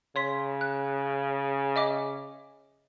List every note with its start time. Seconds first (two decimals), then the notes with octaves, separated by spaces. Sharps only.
0.16 C#3 C#5 C6 B6
0.61 F#6
1.76 D#5 E5 D6